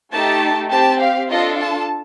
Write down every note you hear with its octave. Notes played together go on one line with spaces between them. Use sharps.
A3 D#4 G4 A5
C4 G4 A5
F5
D4 F4 A4 D#5
A5